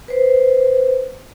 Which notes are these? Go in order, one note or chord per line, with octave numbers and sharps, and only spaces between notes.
B4 C5